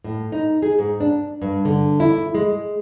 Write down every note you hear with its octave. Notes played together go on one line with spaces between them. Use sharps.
A2
D#4
G#4
G#2
D4
G2
D3
E4
G#3